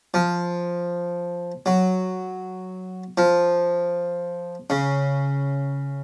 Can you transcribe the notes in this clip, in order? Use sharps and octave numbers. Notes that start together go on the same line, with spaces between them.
F3
F#3
F3
C#3